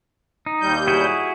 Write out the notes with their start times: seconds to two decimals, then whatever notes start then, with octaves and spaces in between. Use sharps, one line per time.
0.46 D#4
0.61 D#2 G3 G6
0.88 E4 F#4 G#4